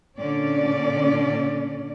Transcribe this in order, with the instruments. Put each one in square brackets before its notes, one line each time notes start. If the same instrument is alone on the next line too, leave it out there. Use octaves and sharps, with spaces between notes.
[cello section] A#2 D3 C#4 D4 D5